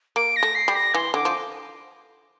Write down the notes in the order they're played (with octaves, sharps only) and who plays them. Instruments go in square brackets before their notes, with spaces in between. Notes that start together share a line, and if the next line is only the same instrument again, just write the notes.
[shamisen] A#3 [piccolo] D7
[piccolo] A#6
[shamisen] A3
[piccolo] C7
[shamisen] G3
[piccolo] A#6
[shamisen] E3 [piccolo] C6
[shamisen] D3 [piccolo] D6
[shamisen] F3